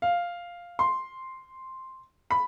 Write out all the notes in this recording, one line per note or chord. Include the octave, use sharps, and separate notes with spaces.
F5
C6
B5